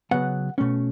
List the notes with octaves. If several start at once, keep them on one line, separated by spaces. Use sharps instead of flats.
C#3 F#3 B3 F#5
B2 A3 C#4